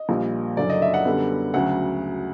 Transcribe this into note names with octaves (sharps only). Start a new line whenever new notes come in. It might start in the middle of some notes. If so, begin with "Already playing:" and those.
Already playing: D#5
A#1 A#2 G3
F#1 F#2 D3 F#3 D5
D#5
E5
F#5
F#2 D3 G3 B3
D2 C#3 F#3 F#5